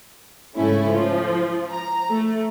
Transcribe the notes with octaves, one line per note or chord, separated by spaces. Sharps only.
G#2 C#3 A3 C#4 E4
F3
A#5
A3